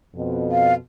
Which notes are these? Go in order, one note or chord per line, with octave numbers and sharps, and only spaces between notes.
F2 B2
F5